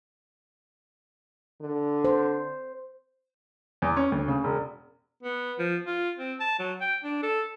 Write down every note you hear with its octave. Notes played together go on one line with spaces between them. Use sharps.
D3
C5
E2
C#4
D2
C#3
E1
B3
F3
F4
C4
A5
F#3
G5
D4
A4